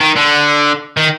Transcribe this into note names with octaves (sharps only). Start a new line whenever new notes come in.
D#3
D3
D#3